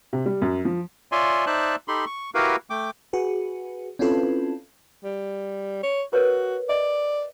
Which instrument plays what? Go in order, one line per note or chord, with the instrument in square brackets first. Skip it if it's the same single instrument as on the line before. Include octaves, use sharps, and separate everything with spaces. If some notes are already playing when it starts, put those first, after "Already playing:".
[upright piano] C3
G3
F#2
F3
[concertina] F4 C#5 D5 E5 G#5 C6
D#4 C5 D5 E5 A5 F#6
D#4 G4 A4 B5 C6
C#6
E4 F#4 G4 A#4 B4 F5
A3 G5 D6
[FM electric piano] F#4 G#4 B4
C4 C#4 E4 F4 A4 B4
[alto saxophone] G3
C#5
[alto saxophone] F#4 [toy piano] A#4 B4 C#5
[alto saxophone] D5 [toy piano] D#5